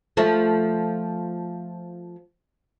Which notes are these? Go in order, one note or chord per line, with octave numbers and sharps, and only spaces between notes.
F3 A3